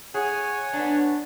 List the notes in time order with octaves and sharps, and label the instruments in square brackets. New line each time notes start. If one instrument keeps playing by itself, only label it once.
[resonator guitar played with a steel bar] G#4 [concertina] C#5 F#5 G#5
[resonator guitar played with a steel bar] B3 D4